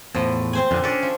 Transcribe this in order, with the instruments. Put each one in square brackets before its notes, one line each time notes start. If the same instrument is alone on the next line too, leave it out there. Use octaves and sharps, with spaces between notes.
[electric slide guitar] E2 A2 [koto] F3
[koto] C4 C5 G#5
[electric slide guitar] F2 D3 [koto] A#2
[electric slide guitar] C#4 [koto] D4 A4
[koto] F3